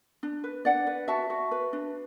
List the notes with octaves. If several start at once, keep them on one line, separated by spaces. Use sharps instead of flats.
D4
B4
D4 D5 F#5
B4
F#4 E5 A5
F#4
B4
D4